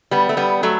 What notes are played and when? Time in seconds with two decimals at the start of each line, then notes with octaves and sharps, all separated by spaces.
0.11 G3 B3
0.29 A3
0.37 G3 B3
0.63 F#3 A3